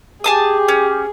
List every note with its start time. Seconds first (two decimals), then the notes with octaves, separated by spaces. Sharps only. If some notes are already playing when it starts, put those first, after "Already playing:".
0.24 G4 G#4 G#5 A5 D#6
0.68 C#4